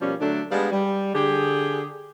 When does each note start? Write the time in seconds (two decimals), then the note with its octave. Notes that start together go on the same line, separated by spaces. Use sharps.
0.01 B2 F3 G3 A#3 C#4
0.20 D3 F#3 A3 D4
0.51 G3 G#3 B3 D4 D5 F5
0.71 G3
1.14 D3 G4 G#4